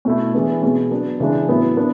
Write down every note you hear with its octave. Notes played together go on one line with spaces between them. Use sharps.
B2 A3 E4
E3 G#3 B3 D4
B2 G#3 B3
F#3 B3 D4
C#3 E3 G#3 D4
A2 F#3 B3 E4
B3 D4